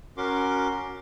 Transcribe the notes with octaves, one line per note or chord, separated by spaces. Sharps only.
C#4 F#4 A#4 C6 D6